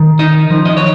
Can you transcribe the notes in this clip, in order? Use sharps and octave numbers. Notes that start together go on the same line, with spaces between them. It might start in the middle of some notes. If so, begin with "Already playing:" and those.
Already playing: D#3
D#4 D#5
F3
D#5
C#5